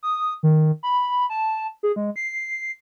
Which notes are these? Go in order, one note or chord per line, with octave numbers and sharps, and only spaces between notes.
D#6
D#3
B5
A5
G#4
G#3
C7